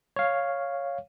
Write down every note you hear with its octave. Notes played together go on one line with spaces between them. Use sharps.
C#5 F5